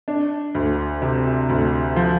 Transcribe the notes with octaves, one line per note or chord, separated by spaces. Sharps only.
D4
D2
C3
D2
F3